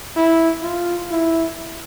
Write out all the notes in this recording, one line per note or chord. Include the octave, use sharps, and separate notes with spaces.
E4
F4
E4